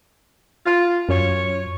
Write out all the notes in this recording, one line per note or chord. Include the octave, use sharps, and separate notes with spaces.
F4
F#2 C#5